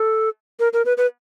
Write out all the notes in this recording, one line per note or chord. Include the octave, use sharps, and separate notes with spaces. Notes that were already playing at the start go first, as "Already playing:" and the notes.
Already playing: A4
A#4
A#4
B4
B4